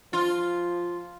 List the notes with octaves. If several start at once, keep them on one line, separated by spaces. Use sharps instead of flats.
F3 F4